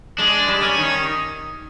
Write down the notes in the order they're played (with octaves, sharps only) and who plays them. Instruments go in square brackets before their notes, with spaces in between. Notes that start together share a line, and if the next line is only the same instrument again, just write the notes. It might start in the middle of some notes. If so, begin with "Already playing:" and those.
[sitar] G#3 [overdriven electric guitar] D4
[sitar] G3
[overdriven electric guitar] C#4
[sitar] D#3